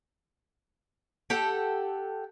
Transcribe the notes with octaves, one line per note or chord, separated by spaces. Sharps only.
G4 A4 F#5 G5